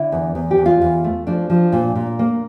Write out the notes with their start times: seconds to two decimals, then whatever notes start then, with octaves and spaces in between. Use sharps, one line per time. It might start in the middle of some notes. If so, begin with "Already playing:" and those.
Already playing: D3 E4
0.12 E2
0.35 E2
0.51 G4
0.58 E2
0.66 F4
0.82 E2
1.04 A3
1.27 F3 D4
1.50 F3
1.72 A#2
1.95 A#2
2.19 A#3